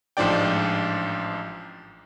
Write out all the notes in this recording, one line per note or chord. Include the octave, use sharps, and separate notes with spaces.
A1 G#2 F3 D4 D5 G5